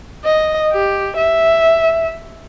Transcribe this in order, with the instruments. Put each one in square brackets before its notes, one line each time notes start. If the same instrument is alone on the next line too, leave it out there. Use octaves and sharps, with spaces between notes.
[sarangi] D#5
G4
E5